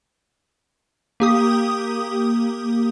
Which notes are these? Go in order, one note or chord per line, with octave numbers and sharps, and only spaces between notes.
A#3 G4 D#6